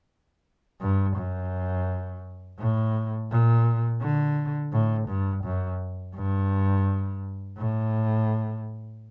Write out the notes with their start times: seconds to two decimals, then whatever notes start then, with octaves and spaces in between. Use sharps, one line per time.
0.81 G2
1.17 F#2
2.59 A2
3.31 A#2
4.01 D3
4.73 A2
5.08 G2
5.44 F#2
6.15 G2
7.58 A2